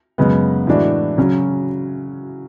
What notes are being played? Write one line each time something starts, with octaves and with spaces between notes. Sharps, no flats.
F#2 C#3 G#3 B3
A2 E3 G#3 D4 F#4
C#3 F#3 C#4